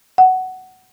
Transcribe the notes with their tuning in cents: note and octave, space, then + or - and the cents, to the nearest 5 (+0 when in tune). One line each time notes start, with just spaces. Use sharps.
F#5 +10